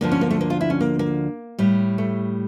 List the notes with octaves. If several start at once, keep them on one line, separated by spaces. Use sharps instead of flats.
D2 D3 F3 A#3
C#4
A#3
A3
A#3
F4
E4
C#4
A#3
A#3
A2 G3
A3